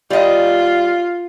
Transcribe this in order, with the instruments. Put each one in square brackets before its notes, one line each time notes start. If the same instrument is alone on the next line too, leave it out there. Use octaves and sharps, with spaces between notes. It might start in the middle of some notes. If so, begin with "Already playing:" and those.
[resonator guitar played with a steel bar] G3 D#5 [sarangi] F4